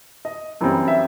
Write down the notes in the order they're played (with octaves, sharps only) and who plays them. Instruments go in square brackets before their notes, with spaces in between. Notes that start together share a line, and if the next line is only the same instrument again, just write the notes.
[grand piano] D#5
F#2 E3 G3 C4
E5